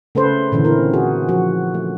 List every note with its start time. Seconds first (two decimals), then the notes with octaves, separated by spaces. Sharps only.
0.15 C#3 A3 A4 B4 C5
0.52 A#2 D3 E3 C#4
0.65 C4 E4 A#4
0.94 F#4 G#4
1.29 F3 F#4
1.74 A3